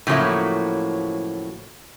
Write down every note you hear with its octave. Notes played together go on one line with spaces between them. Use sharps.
A2 C#3 F3 F#3 A#3 E4